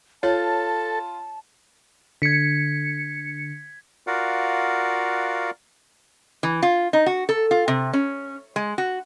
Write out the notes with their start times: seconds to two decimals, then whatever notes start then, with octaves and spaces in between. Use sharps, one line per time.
0.23 F4 A4 C#5 A5
2.22 D3 G#6 B6 C#7
4.07 F4 F#4 A#4 D5 F5 F#5
6.43 E3
6.63 F4
6.93 D#4
7.06 F#4
7.29 A4
7.51 F4
7.68 C3
7.93 C#4
8.56 G#3
8.78 F#4